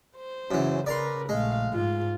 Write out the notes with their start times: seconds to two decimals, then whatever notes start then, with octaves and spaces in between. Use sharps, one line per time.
0.17 C5
0.51 F#2 C#3 E3
0.86 C#3 A#4 B4 D5 A#5 C6
1.29 A#1 G#3 A3 F5
1.73 G#2 F4